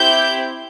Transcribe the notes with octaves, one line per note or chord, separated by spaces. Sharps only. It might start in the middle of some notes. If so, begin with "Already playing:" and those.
Already playing: C4 E4 G4 G6